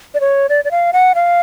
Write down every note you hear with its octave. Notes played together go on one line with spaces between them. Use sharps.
D5
C#5
D5
D5
F5
F#5
F5